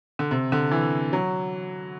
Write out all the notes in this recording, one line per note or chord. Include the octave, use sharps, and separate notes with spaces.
D3
C3
D3
E3
F#3